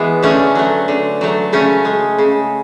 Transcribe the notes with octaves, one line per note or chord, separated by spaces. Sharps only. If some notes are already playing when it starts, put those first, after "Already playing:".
Already playing: E3 G#3 B3
D3 A3 C#4
F#3 A3
D3
F#3 A3
C#3 A3 C#4
G#3
C#3